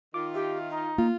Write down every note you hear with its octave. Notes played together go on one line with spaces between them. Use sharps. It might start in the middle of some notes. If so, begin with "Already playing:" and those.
D#3 F4 D6
G4 E5
D#4
A#3 F4